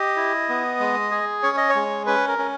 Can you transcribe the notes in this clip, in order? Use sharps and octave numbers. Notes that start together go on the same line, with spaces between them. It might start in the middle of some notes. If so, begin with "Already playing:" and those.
Already playing: G4 D#5
E4
B3
G#3
G#4
C#4 C#5
D#5
C#5
G#3
C#4 B4
A#4
C#4